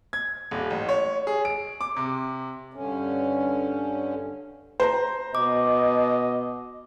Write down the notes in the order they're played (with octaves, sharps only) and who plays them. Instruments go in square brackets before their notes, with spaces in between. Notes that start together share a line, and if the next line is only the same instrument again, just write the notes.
[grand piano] G#6
D#1
A1
C#5
G#4
D7
D6
C3
[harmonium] G2 D3 C#4
[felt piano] C5 A#5
[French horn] B2 [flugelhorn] D#5 [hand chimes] D6